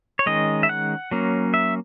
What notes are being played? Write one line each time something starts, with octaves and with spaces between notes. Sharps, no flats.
C#5
D#3 G#3 C#4 D#5
E5
F#5
F#3 A#3 C#4
E5